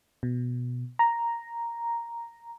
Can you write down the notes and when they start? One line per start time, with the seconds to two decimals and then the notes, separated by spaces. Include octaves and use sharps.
0.23 B2
0.99 A#5